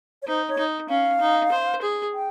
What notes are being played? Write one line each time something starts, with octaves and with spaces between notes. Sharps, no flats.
C#5
D#4 C5
C#5
D#4
C#4 F5
D#4
C5
G#4
G5